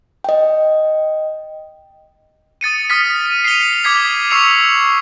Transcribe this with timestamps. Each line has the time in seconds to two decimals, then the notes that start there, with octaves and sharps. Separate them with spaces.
0.24 D#5 G5
2.61 D#6 A6 C#7 D#7
2.90 D#6 F6 A6 B6
3.26 D#7
3.44 C7 C#7 D#7 F7 G7
3.84 D6 D#6 G#6 B6 C7
4.31 C#6 D6 E6 C7 C#7 F7